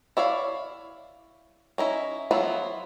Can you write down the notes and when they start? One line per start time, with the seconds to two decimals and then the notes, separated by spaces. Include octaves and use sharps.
0.17 E4 C#5 D5 F5
1.78 C#4 D#4 E4
2.31 F3 F#3 B3 E4 F4